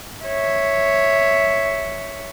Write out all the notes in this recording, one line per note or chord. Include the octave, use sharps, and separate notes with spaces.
C#5 E5